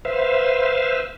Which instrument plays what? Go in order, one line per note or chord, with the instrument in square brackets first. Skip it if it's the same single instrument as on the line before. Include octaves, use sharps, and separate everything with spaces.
[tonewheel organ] B4 C5 E5 F5